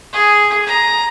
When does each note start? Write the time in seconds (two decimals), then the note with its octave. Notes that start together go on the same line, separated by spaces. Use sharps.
0.13 G#4
0.67 A#5